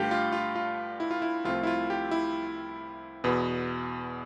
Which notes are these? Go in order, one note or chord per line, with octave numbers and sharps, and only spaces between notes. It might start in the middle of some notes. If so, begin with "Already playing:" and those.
Already playing: G2 D3 A3 F4 G4
F4
F4
F4
E4
F4
E4
C2 C3 F3 A3 C4 F4
E4
F4
G4
E4
E2 B2 B3